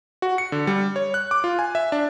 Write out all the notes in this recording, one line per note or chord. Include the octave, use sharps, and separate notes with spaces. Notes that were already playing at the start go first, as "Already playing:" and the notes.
F#4
C#7
D3
G3
C#5
F#6
D6
F4
G#5
E5
D4